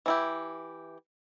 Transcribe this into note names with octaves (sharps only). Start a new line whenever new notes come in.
E3 E4 G4